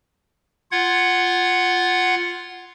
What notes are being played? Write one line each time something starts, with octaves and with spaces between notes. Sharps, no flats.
F4 F#5 G#6